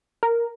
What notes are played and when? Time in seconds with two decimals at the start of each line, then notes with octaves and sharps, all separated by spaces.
0.23 A#4